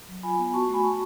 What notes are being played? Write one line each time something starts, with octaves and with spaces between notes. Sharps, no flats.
F#3
F4 G#5 B5
B3
F#4 A5 C#6
A3
G#5 B5
F#4 A5 C#6